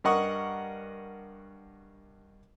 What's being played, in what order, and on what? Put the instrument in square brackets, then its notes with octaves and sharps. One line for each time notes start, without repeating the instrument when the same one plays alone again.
[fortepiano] G2 A#4 D#5 F#5 C#6 D#6